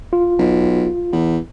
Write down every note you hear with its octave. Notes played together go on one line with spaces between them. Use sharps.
F4
B1
E2